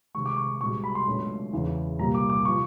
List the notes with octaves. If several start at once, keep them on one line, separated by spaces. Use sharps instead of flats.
C3 D#3 G#3 C#6
D6
C#6
C2 B2 G#3 C#6
B5
C6
C#2 B2 F#3 A3 D4
E2 C#3 E3
C2 A#2 G3 A#3 A#5
D6
D6
C3 F3 C#6